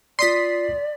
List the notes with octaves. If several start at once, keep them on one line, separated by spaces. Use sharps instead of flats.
F4 D5 C6 D#6 B6 C7